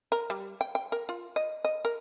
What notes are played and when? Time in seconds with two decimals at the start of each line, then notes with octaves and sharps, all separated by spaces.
0.12 A#4
0.30 G3
0.61 G5
0.75 G5
0.92 A#4
1.09 F4
1.36 D#5
1.65 D#5
1.85 A#4